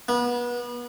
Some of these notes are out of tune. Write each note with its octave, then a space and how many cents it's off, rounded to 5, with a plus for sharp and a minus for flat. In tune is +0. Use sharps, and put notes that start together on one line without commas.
B3 -30